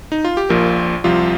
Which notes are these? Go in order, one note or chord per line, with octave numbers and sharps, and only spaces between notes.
D#4
F4
G4
A#1 A#2 F3 A#4
C2 C3 F3 F4